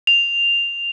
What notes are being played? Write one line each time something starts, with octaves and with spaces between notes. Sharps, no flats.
F7